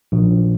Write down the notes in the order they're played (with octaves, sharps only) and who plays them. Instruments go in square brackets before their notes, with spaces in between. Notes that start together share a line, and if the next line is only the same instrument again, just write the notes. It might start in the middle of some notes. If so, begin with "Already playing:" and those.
[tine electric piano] A#1